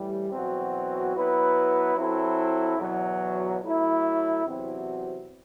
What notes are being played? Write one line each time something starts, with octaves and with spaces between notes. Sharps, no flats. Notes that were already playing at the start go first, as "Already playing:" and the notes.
Already playing: A2 E3 G3
E2 B2 F#3 C4 F#4
F#3 B3 E4 B4
F#3 C4 E4 A4
E2 B2 F#3
F#3 A3 E4
E2 C3 F#3 C4 F#4